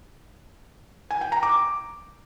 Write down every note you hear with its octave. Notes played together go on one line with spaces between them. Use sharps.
G#5
G5
A#5
D6